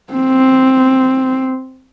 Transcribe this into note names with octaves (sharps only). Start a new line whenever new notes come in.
C4